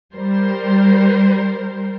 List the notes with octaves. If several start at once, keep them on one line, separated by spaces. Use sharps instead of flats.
G3 A#4 C5